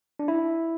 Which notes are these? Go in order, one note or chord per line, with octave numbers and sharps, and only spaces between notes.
D4
E4